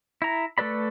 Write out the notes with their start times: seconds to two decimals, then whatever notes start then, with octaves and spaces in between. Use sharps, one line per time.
0.22 E4 A#5
0.58 A3 A4 B4 D5 B5